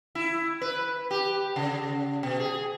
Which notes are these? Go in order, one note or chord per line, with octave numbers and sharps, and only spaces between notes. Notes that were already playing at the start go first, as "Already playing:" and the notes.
E4
B4
G4
C#3
B2
G#4